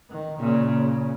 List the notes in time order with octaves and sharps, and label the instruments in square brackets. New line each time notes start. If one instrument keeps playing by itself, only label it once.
[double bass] D#3
[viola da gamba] A#2 [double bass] C#3